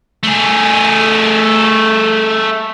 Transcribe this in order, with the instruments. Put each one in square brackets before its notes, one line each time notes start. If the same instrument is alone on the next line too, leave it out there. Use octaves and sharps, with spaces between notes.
[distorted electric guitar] A3 G#4